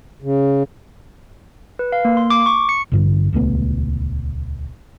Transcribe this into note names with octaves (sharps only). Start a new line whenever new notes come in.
C#3
B4
F5
A#3
C6
D6
C#6
C#7
A1 G2 D3
D#1 C#2 A3 B3